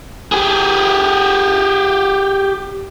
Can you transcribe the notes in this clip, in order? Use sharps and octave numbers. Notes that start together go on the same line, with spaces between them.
G4 G#4